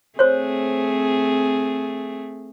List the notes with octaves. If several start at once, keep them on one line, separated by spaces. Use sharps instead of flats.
A3 C4 G#4 C5 C#5